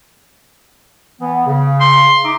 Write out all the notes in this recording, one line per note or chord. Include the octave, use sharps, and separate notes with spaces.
E3 B3
C#3
C6
D#4 E5 D6